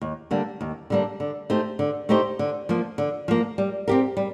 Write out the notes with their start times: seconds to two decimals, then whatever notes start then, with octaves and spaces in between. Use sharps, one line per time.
0.01 D#2
0.31 D3 G3 A#3 D4
0.61 D#2
0.90 D3 G3 A#3 D4
1.20 D3
1.50 A3 D#4 G4 C5
1.79 D3
2.09 A3 D#4 G4 C5
2.39 D3
2.69 F3 A#3
2.98 D3
3.28 F3 A#3
3.58 G3
3.88 C4 G4 A#4
4.17 G3